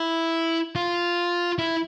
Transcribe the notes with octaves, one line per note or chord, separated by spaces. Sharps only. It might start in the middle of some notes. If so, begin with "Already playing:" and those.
Already playing: E4
F4
E4